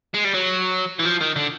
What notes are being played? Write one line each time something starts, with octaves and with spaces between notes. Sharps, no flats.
G#3
G3
F#3
E3
F3
D#3
D3